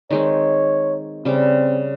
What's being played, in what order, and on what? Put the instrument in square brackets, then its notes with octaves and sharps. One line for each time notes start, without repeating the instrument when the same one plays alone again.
[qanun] D#3 G#3 C4 [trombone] C#5
[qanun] C#3 G3 D6 [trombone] C4